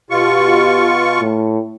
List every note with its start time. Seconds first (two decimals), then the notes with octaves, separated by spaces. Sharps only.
0.10 B2 F4 G4 C#6
1.21 A2